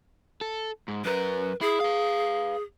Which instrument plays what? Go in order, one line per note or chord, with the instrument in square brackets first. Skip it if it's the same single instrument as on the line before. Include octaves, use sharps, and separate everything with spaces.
[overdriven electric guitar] A4
G#2
[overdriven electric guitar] F#2 A#4 [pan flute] B4
[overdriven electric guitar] E4 [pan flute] G#4
[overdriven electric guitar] B4 F5